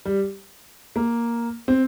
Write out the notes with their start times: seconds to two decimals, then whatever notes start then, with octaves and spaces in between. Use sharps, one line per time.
0.05 G3
0.96 A#3
1.68 C4